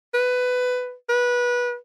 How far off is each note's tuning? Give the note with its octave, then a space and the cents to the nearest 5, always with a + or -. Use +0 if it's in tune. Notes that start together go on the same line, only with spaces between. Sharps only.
B4 +15
B4 -20